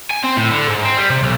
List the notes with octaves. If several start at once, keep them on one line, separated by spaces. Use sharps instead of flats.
G#5
C4
A2
D3
G#2
C4
G3
C3
B1